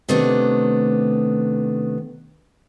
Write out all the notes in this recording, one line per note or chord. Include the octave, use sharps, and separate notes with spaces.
C3 D#3 A3 B3 D4